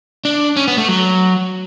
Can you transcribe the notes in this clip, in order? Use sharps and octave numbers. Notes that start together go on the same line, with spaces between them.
D4
C#4
B3
A3
F#3